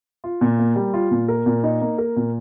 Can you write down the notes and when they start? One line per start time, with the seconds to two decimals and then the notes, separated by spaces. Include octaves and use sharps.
0.24 F4
0.41 A#2
0.59 A#3
0.76 G3
0.94 F4
1.11 A#2
1.28 A#4
1.46 A#2
1.64 D#4
1.81 A#3
1.98 A#4
2.16 A#2